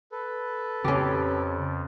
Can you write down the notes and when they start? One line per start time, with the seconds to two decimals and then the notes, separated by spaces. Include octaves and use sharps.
0.12 A4 B4
0.85 F2 C#3 C#4 G4